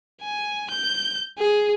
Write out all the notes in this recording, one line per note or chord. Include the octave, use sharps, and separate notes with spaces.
G#5
G6
G#4